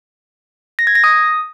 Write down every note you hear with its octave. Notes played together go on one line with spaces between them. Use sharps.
A#6
G#6
A#6
D#6